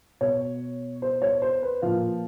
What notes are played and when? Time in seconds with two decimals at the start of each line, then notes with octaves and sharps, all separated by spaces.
0.21 B2 C#5
1.02 C5
1.22 C#5
1.42 C5
1.62 B4
1.82 A#2 F3 F5